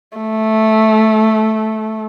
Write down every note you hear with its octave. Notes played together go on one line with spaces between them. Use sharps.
A3